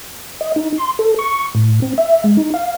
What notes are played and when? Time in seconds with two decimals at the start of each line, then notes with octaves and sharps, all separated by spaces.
0.41 D#5
0.56 D#4
0.78 C6
0.99 A4
1.19 C#6
1.55 A2
1.82 C4
1.98 E5
2.24 G#3
2.37 D#4
2.54 F5